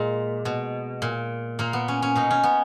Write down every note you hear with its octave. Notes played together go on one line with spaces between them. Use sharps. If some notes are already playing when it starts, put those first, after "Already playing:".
Already playing: A#2 G#3
B2
A#2
A#2 A#3
B3
C#4
C#4
B2 D#4
C#4
B3